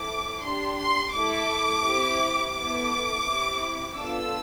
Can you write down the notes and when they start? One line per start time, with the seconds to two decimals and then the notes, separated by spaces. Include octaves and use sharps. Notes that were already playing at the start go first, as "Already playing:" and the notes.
Already playing: C4 E4 A4 D6
0.43 D4 G4 C6
0.79 C6
1.14 A3 E4 A4 D6
1.84 C4 E4 G4
2.55 B3 E4 A4 D6
3.26 C4 E4 G4
3.96 B3 D4 F4 A4 E6